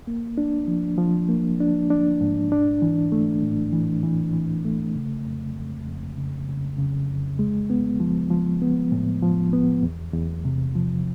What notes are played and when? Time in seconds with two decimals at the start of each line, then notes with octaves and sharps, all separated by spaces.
0.07 A#3
0.38 D4
0.68 F3
0.98 F3
1.29 A#3
1.60 D4
1.90 D4
2.21 G#2
2.52 D4
2.82 E3
3.12 A3
3.43 A2
3.73 E3
4.03 E3
4.34 E3
4.65 A3
4.96 C#3
5.25 F2
5.56 F2
5.87 F2
6.17 C#3
6.48 C#3
6.78 C#3
7.09 F2
7.39 G#3
7.70 B3
8.00 F3
8.30 F3
8.62 B3
8.92 A2
9.22 F3
9.53 B3
9.83 E2
10.13 E2
10.45 C3
10.75 F3